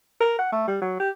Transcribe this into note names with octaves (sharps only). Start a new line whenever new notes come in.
A#4
F#5
A3
G3
F#3
G4